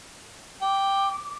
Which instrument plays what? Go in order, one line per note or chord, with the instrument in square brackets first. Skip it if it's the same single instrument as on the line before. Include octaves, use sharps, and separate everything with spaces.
[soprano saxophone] G5 [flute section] D6